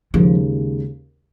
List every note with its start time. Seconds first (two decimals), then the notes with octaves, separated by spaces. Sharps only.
0.14 D#2 C#3 F3 G#3